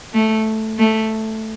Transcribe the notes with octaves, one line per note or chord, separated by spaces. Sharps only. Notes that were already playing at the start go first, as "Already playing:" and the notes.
A3
A3